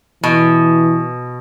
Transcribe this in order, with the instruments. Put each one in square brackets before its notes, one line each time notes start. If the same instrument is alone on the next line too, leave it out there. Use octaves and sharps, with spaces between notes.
[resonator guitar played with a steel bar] B2 [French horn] E3